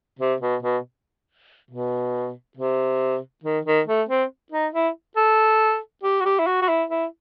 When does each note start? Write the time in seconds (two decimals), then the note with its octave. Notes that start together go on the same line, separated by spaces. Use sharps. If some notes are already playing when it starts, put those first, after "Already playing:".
0.19 C3
0.41 B2
0.62 B2
1.71 B2
2.57 C3
3.44 D#3
3.65 D#3
3.87 A3
4.09 C4
4.52 D#4
4.73 E4
5.17 A4
6.03 G4
6.21 F#4
6.25 G4
6.39 E4
6.46 F#4
6.62 F#4
6.68 E4
6.90 E4